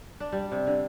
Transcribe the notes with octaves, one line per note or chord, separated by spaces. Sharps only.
D4
G3
C3
D3